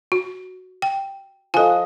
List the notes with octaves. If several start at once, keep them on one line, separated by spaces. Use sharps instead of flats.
F#4
G5
F3 A4 D#5 G#5